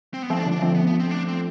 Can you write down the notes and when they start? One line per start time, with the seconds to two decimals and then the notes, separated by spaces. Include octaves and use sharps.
0.14 C4
0.22 B3
0.30 F3 A3 C4
0.39 D4
0.46 D3 F3
0.52 D4
0.62 F3 A3 C4
0.75 B3
0.87 B3
1.00 C4
1.11 D4
1.28 C4